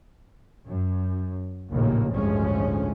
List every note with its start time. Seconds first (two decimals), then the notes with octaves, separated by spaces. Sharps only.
0.66 F#2
1.72 A#1 D#2 A2 C#3 A#3
2.13 A1 D2 G2 F3 G#3 C#4